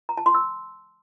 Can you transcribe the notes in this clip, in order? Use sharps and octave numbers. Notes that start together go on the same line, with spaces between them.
A#5
A5
C6
E6